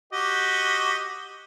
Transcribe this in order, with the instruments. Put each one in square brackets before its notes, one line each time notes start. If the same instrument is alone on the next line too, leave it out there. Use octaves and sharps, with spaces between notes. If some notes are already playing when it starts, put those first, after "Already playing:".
[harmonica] F#4 G4 D#5